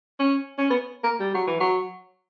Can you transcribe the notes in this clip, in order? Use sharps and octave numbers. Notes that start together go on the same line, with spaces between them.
C#4
C#4
B3
A#3
G3
F#3
E3
F#3